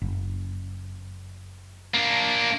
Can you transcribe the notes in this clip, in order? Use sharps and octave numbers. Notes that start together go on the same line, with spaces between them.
F#1
A#3 D4